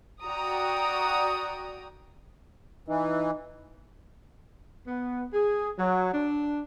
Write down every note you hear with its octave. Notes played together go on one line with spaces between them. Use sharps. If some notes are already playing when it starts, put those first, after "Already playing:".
F#4 D5 G5 A#5 D#6
E3 D#4
B3
G#4
F#3
D4